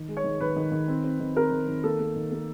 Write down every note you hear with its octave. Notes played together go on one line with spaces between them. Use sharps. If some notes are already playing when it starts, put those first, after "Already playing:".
Already playing: D#3
G#3
C#5
D#3
D#3 B4
D#3
D#3
C4
C4
D#3
C4 A#4
D#3
D#3
A#3 A4
A#3
D#3
A#3